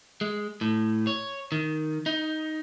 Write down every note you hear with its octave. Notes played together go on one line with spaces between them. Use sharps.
G#3
A2
C#5
D#3
D#4